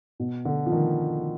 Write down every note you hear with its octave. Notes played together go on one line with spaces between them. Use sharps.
B2
D3
F3
D#3